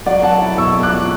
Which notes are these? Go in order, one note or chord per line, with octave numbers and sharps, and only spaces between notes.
F#3 D5 F#5
F#3 F#5 A5
E4
B2 C#6 E6
B2
D6 F#6
F#3